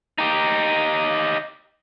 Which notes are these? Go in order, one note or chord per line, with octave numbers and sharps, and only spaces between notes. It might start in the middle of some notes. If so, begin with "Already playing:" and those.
D#4 G4